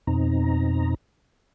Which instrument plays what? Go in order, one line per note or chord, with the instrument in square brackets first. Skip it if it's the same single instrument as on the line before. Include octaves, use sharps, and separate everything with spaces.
[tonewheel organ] F2 B2 C4 D#4 A#5